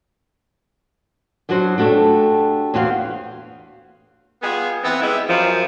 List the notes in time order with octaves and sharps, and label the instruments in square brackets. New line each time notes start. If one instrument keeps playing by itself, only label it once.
[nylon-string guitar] F#2 F#3 D4 F#4 C5
A3 D4 F#4 G4
E2 C4 F#4 F5
[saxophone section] G3 B3 F4 G#4
E3 B3 C4
G3 G#3 E4
F#2 F3